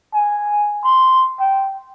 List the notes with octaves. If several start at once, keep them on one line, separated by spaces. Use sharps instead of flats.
G#5
C6
G5